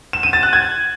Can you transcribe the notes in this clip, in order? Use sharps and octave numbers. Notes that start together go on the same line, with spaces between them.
E7
D#7
A6
F#6
G#6